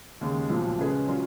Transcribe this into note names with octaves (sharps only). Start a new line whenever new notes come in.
D#2 C#3 G#3
B1 A#2 F3
C#3 G#3 C#4 G#4 B4
F#3 C#4 F4